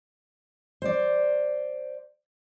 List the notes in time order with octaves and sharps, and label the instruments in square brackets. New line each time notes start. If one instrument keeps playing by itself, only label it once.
[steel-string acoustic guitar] C5 D5